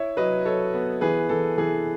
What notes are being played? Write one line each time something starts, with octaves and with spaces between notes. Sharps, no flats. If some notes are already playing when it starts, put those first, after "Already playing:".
Already playing: E4 C#5 E5
F#3 B4 D#5
F#3 A4 C#5
B3
E3 G#4 B4
E3 A4
E3 G#4